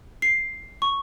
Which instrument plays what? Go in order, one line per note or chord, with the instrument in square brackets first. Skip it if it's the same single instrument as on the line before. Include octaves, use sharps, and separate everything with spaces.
[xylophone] C7
C#6